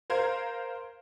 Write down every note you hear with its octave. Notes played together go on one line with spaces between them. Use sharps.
A#4 C5 F5 A#5 G#6